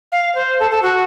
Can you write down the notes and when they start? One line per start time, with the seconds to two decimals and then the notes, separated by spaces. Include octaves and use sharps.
0.12 F5
0.35 C5
0.60 A4
0.71 A4
0.82 F#4